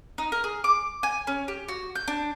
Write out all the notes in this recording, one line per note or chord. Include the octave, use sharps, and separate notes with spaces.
D#4
A#4
G#4
D6
G#5
C#4
G4
F#4
G6
D4